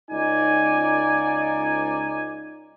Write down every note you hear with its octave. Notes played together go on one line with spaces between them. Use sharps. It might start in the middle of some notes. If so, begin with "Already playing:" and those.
C#2 D#4 D5 G#5